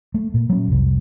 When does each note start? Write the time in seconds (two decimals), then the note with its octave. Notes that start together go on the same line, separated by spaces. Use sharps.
0.14 A3
0.34 A#2
0.49 F#3 C#4
0.68 F1 C2